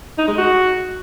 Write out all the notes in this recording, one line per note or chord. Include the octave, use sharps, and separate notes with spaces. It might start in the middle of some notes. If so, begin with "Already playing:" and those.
D#4
G#3
F#4